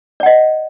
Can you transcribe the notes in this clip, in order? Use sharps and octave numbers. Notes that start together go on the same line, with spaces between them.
D5 D#5 F#5